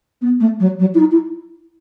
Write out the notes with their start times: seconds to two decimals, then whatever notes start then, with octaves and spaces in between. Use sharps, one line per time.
0.21 B3
0.40 A3
0.60 F#3
0.79 F#3
0.94 E4
0.99 D#4
1.11 E4